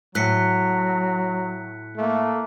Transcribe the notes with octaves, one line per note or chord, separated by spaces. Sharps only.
A2 F#3 F#6 B6 C#7
A3 A#3